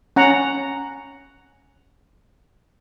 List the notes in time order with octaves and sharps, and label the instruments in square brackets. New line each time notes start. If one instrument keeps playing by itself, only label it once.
[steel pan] C#4 F#5 A#5